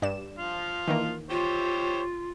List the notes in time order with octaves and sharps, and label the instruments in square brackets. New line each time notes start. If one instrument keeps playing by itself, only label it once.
[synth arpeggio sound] G2 D5 E7
[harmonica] F3 F4
[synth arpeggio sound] D#3 E3 A#3
[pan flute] F4 [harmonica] G4 C5 C#5